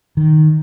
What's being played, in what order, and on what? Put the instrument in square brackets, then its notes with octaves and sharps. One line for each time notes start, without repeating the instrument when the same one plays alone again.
[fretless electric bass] D#3